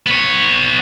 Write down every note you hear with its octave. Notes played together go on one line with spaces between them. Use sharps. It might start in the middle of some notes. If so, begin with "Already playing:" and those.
B3 C#5